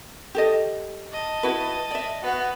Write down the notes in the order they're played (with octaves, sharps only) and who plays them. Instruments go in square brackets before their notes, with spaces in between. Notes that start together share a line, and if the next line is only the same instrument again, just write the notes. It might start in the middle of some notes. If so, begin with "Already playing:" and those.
[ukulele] G4 A4 D#5
[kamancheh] D#5 A5
[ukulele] E4 F#4 B4
D5 E5
[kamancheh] B3 F#4